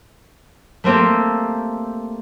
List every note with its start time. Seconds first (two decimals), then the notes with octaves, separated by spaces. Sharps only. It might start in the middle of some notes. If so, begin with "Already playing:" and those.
0.84 A3 A#3 C4 G4 A4